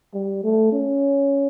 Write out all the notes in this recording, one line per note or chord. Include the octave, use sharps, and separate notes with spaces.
G3
A3
C#4